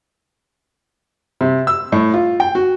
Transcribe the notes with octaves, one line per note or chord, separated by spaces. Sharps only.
C3
E6
A2
F4
G5
F#4